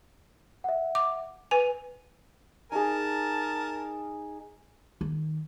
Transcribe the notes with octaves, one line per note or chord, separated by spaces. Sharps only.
E5 F#5
D6
B4 G#5 D#7
D#4 G#4 A#4 A5
D#3